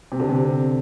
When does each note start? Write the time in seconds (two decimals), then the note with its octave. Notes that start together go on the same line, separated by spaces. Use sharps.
0.12 C3
0.20 D3
0.29 C3